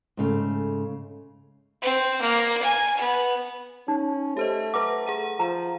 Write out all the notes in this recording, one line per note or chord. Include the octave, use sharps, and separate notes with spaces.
G#2 C#3 A3
C4
A#3
G#5
B3
C#4 D#4
A3 G4 C5 D#5
B4 F#5 A#5 D6 A#6
G#4 F#5 D#7
F3 A#5